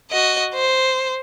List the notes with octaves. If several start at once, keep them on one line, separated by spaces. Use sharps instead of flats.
F#4 D#5
C5